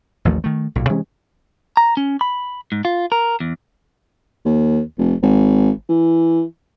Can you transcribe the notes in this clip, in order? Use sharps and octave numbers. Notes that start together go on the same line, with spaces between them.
A1 D#2 F3 A3
D#3 A3
B1 A#2
C3 E3 G#3 C#4
A#5
C#4
B5
G#2
F4
A#4
E2
D#2
F1
G#1
E3